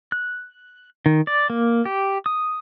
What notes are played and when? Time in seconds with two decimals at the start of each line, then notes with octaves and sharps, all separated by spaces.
0.12 F#6
1.06 D#3
1.27 D5
1.50 A#3
1.85 G4
2.26 D#6